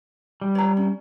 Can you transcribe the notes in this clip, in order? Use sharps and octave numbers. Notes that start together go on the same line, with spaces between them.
G3
C#5 A#5
C#4